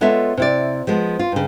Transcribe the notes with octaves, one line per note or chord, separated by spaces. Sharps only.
G#3 B3 F4 A4 C#5 E5
C3 E4 D5
F3 G#3 B3
F4
G2 C#3